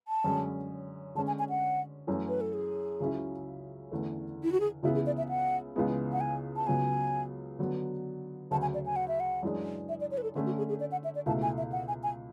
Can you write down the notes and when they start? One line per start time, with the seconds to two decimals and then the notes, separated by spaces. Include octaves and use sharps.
0.08 A5
0.24 F#2 D3 G#3 C#4
1.15 D3 G#3 C#4 A5
1.27 G#5
1.39 G#5
1.50 F#5
2.07 F#2 E3 A3 C#4
2.28 B4
2.41 A4
2.54 G#4
3.00 C#2 C#3 F#3 C#4 E4
3.92 E2 D3 A3 C#4
4.43 E4
4.52 F#4
4.60 G#4
4.83 C#2 C#3 E3 B3 E4 F#4
4.95 G#4
5.06 D5
5.18 E5
5.29 F#5
5.76 C#2 C#3 E3 G#3 B3
6.13 F#5
6.21 G#5
6.56 A5
6.67 C#2 C#3 F#3 B3 G#5
7.59 D3 F#3 B3
8.51 D2 C#3 F#3 A5
8.62 G#5
8.74 D5
8.86 G#5
8.96 F#5
9.08 E5
9.20 F#5
9.43 F#2 E3 G#3 D4
9.89 E5
10.01 D5
10.11 C#5
10.18 B4
10.23 A4
10.35 D3 A3 C#4 G#4
10.46 F#4
10.58 G#4
10.69 G#4
10.80 D5
10.92 F#5
11.04 E5
11.15 D5
11.26 C#2 B2 A3 E4 A5
11.42 G#5
11.57 E5
11.72 F#5
11.88 G#5
12.03 G#5